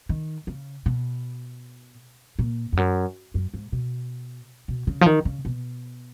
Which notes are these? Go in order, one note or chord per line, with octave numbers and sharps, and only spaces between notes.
D#3
C#3
B2
A#2
F2
F#2
F#2
G#2
B2
B2
C#3
F3
D#3
C#3
B2